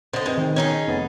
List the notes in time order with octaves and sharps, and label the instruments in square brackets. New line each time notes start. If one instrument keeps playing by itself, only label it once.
[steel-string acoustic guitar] D3 D#5 [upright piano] C5
[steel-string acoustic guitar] G#3 [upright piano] C4 B4 C5
[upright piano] D#3
[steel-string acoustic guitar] C#4 D#4 G#4
[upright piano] F1 B3 A6